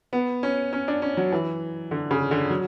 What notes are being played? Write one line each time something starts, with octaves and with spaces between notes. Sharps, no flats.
B3
C#4
C#4
D4
C#4
F#3
E3
D3
C#3
D3
F#3